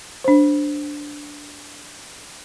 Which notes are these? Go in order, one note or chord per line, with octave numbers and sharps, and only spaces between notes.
D4 C5